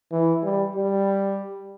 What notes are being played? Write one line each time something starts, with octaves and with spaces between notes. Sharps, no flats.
E3
G3
G3